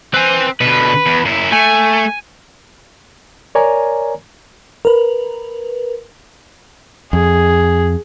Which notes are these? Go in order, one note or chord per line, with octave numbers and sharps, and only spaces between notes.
C4 B4 G#5
B2 D3 B4
E2
F#2 E4
A3 G#5
A#4 C#5 D5 G#5 A#5
A#4 B4
F2 G#4